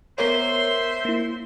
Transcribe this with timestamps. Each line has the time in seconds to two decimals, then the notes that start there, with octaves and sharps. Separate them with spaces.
0.18 B3 A#4 C5 C#5 E5 C6
1.05 A#3 E4